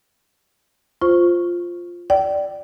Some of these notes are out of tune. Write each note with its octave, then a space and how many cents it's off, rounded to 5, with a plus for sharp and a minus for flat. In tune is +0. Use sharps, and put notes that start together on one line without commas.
F4 +0 C5 +0 C#6 -5
D5 +0 G5 -35